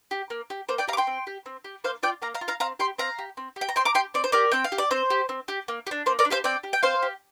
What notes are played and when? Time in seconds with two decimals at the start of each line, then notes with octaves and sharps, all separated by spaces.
0.11 G4
0.30 A#3
0.50 G4
0.69 A#3 C5
0.78 D5 G5
0.88 G4 F5 A#5
0.93 D6
0.97 G5 C6
1.07 C4
1.27 G4
1.46 C4
1.64 G4
1.84 A#3 C5 F5
2.03 F4 D5 G5
2.22 A#3 F5 A#5
2.34 F5 A#5
2.41 F4
2.48 F5 A#5
2.60 C4 F5 A#5
2.79 G4 G5 C6
2.98 C4 F5 A#5
3.19 G4
3.37 C4
3.56 G4
3.61 G5
3.69 A#5
3.76 C4 G5 C6
3.85 A#5 D6
3.94 G4 G5 C6
4.14 C4 D5
4.24 C5
4.32 G4 A#4 D5
4.52 C4 G5
4.64 F5
4.72 G4
4.78 D5
4.91 C4 C5
5.10 G4
5.29 C4
5.48 G4
5.68 A#3
5.87 G4
5.91 D4
6.06 A#3 C5
6.19 A#4 D5
6.25 D4
6.30 G4 C5 F5
6.44 C4 D5 G5
6.63 G4
6.73 G5
6.83 C4 C5 F5
7.02 G4